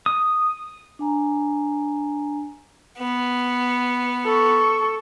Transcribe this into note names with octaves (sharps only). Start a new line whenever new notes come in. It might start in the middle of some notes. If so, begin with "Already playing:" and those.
D#6
D4 G#5 A#5
B3
A4 C#6